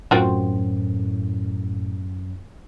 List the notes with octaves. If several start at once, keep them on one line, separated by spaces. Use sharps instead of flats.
F#2 A2 C4 F4 F#4